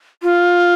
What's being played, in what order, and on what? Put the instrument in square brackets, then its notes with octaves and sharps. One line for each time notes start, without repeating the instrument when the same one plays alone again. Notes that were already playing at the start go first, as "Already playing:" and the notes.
[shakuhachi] F4